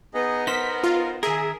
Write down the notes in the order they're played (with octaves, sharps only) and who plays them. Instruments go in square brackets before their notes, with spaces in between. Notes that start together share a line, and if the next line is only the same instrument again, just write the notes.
[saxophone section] B3 [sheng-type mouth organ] D#4 G#4 D#5
[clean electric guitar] D#4 C5 [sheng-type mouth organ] A#4 [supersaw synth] B6
[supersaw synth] F4
[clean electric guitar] D#3 A#4 [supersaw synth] G#4 [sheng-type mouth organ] E5